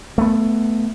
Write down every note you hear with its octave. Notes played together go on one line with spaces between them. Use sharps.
A3 B3